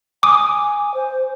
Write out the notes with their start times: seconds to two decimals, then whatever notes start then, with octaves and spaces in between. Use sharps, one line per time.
0.23 G#5 D6 D#6
0.94 C5